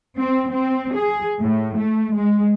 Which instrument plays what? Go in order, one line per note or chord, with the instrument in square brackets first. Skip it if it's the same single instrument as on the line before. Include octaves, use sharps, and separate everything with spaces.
[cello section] C4
C4
G#4
A2
A3
G#3